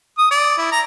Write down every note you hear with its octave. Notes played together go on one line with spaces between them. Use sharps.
D#6
D5
E4
A#5